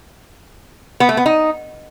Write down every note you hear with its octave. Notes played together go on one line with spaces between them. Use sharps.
B3
A3
B3
D#4